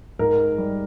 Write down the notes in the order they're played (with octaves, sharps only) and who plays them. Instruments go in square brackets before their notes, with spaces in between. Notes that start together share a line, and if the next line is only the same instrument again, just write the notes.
[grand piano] G#2 A#4
G3